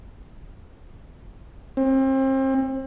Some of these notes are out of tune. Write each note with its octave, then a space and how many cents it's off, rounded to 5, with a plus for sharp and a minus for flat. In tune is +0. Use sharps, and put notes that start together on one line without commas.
C4 +35